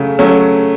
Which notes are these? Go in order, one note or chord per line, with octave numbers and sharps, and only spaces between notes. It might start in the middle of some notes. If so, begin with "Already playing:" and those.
Already playing: C#3 F#3 A3 C#4
F#3 A3 C#4